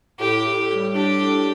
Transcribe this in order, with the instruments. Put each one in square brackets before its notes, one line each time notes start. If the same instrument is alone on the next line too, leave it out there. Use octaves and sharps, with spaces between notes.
[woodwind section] A2 [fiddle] G4
[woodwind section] A2
G3
[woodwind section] D4 [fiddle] G4
[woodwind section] A2